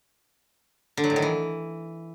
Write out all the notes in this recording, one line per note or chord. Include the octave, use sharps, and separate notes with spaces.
D3
F#3
A2
D#3
E3